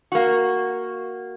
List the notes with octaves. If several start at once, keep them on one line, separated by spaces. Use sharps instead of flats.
A#3 F#4